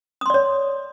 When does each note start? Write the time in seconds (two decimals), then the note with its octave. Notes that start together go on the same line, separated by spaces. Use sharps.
0.21 D#6
0.26 C6
0.30 D5
0.34 C#5